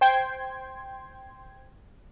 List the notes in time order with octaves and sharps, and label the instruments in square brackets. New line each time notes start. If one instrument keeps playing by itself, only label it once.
[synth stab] C5 G5 C6 G#6